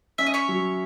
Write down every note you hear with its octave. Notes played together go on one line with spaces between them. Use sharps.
C#4 E5
D#5
C#5 E5
F#3